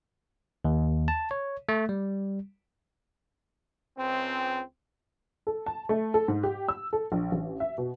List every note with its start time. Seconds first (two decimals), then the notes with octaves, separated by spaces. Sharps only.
0.65 D#2
1.08 A5
1.31 C#5
1.69 A3
1.89 G3
3.98 C#2 C4
5.47 A4
5.66 A5
5.89 A3
6.14 A4
6.28 G#2
6.43 G4
6.68 E6
6.93 A4
7.12 A#1
7.32 A1
7.60 E5
7.78 B2